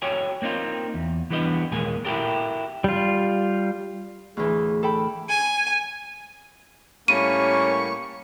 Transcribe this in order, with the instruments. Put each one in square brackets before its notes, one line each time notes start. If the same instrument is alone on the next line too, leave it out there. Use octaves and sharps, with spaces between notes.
[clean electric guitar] F#4 A4 C#5 G5 G#5
A#3 C4 D#4 F4
E2
E3 G3 B3 D4 D#5
D#2 A#2 G#3 A#3 G#5
E4 F#4 G4 A4 A#4
[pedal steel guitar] G3 F4
[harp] D2 A2 E3 [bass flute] G#4
[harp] A4 G5 B5
[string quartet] G#5
[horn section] A2 G3 A#3 [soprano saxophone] C#4 [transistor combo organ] C#6 [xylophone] D#7